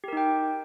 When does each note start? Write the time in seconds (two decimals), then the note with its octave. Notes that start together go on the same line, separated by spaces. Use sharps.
0.04 G4
0.08 A#4
0.13 D#4
0.17 G5